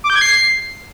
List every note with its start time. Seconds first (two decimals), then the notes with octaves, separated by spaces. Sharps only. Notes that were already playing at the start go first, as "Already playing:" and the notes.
0.04 D6
0.10 G6
0.16 G#6
0.21 C7